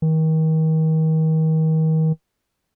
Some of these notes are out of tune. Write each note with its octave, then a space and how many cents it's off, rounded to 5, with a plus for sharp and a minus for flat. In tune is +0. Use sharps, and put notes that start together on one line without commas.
D#3 +35